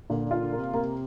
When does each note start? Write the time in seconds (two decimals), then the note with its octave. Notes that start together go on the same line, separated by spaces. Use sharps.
0.10 A#2 D3
0.25 D3
0.31 F4
0.42 D3
0.52 A#3
0.57 C3
0.73 C3 A#3